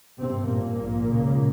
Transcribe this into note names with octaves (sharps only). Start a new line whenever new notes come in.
G#1 G2 C3 C4
G#1 G2 A#2 A#3
A#1 G#2
C#2 C#3